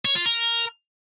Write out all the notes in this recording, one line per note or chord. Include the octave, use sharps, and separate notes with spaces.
C#5
F4
A#4